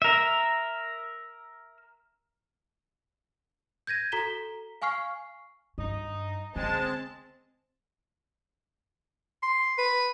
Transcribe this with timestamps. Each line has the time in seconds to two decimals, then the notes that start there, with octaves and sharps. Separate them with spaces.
0.02 A#4 E5
3.87 G6 G#6 A#6 D#7
4.12 F#4 A4 A#5 B6 E7 G7
4.82 F5 G#5 C#6 F6 C7
5.78 G2 D#4 D#5
6.56 D3 G#3 C4 A5
9.43 C6
9.78 B4